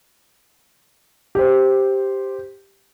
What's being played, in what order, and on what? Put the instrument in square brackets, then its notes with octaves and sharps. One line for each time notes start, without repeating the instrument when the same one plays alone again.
[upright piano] G4 C5